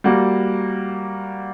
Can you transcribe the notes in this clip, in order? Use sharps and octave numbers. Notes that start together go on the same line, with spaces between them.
G3 A#3 F#4